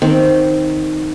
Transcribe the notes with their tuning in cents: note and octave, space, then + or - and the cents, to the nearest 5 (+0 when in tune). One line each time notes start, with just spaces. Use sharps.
D#3 +0 C4 +0